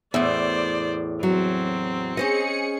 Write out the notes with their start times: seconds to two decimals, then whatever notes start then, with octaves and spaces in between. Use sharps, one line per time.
0.14 E2 A2 C5 D5
1.23 F#3 C4
2.17 C#4 G#4 C5 D#5 C#7